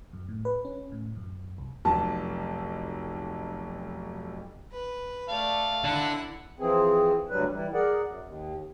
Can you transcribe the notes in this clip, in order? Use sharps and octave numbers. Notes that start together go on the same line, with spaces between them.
F#2
A2
B4
C#4
A2
F#2
C2
F1 B1 A5
B4
A3 D5 F5
D3 E4 F#5
E3 F3 C4 G#4
D2 G2 F#3 G3 B4
E3 G3
G#4 A#4 D5 F#5
F#2
D#2